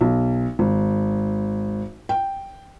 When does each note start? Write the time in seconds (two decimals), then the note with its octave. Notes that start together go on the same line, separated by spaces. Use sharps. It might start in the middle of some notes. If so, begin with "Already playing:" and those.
0.01 B1
0.59 G#1
2.09 G5